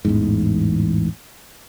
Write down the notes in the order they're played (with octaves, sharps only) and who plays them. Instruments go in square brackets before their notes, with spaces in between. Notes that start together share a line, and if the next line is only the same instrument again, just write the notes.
[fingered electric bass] A1 E2 G#2